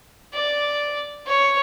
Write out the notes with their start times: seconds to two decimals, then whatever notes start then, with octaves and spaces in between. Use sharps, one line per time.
0.34 D5
1.26 C#5